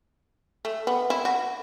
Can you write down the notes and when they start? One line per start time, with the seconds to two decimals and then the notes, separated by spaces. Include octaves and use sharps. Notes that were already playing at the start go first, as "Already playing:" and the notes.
0.65 A3
0.87 B3
1.10 E4
1.25 F#4